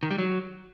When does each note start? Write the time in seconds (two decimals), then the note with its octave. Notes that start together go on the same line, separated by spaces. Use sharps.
0.03 D#3
0.11 G3
0.18 F#3